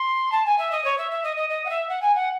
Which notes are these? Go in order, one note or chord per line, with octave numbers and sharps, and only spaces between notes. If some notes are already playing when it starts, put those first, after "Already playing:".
Already playing: C6
A5
G#5
E5
D#5
C#5
E5
E5
D#5
D#5
D#5
F#5
E5
F#5
G#5
F#5